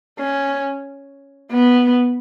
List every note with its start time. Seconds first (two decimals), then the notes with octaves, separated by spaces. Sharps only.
0.18 C#4
1.52 B3